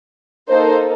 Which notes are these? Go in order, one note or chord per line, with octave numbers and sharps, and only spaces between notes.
A#3 D#4 A4 C5